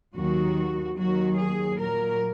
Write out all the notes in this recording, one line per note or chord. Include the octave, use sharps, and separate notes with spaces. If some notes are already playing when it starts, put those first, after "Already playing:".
D#2 D#3 F#3 F#4
D#2 D#3 F#3 F#4
G#4
A#2 F#3 A#4